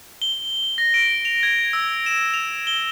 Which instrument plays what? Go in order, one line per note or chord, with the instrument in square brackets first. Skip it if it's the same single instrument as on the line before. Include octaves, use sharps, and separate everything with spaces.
[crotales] G7
A#6
D7
F7
G#6
E6
E7
F7
G7